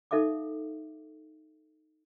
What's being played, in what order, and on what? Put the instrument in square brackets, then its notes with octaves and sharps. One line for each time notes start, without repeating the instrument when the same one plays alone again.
[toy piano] D#4 A4 E5 F5 D6